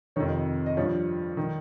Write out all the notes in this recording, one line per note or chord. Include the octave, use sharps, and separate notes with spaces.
F2 C3 D#3 C#5
D#5
G2 F3 C#5
D#3